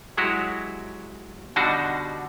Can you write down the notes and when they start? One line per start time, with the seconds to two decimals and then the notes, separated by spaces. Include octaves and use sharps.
0.17 F#3 G#3 E4 F#4 G4
1.56 B2 D3 G3 D4 D#4 F#4